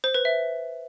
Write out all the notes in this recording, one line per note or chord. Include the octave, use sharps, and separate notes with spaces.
C5
B4
E5